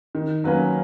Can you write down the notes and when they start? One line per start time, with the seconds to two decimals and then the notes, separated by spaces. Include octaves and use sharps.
0.15 D#3
0.44 F#3 A#3 C#4 B4